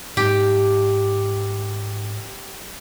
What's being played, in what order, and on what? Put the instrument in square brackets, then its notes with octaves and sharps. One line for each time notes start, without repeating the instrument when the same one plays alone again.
[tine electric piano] G#2 [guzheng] G4